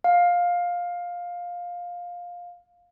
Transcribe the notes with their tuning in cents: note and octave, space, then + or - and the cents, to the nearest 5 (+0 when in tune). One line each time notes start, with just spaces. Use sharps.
F5 +15